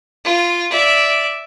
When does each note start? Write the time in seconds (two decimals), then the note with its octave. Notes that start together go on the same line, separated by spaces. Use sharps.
0.25 F4
0.71 D5 E5